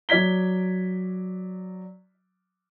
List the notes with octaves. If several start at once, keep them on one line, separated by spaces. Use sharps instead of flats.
F#3 D5 G#6 B6 G7